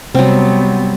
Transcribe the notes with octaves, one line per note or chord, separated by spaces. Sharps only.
C3 F#3 G3 B3 C4